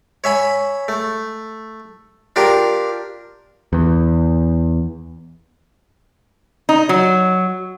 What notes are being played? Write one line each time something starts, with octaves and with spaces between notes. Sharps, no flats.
C#5 E5 G#5 B5
A3
D4 F4 G4 A#4
E2
D#4
F#3